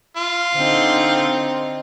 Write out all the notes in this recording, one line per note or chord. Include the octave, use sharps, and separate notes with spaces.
F4
D3 C4 D#4